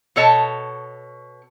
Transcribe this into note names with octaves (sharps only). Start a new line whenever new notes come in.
B2 A4 C#5 D#5 A5